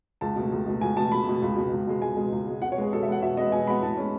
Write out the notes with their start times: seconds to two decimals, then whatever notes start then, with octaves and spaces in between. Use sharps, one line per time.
0.21 C#2 A5
0.36 B2 A3
0.52 C#2
0.66 B2 A3
0.81 C#2 G#5
0.97 B2 A5
1.00 A3
1.12 C#2 B5
1.27 B2 A3
1.42 C#2
1.56 B2 G#3
1.72 C#2
1.87 B2 G#3
2.02 C#2 G#5
2.17 B2 G#3
2.32 C#2
2.47 B2 G#3
2.62 B2 F#5
2.72 C#5
2.78 G#3 B3 G#4
2.93 B2 A4
3.03 E5
3.07 G#3 B3 F#5
3.22 B2 E5
3.37 G#3 B3 D#5
3.52 B2 G#5
3.67 G#3 B5
3.70 B3
3.82 A2 A5
3.97 G#3 C#4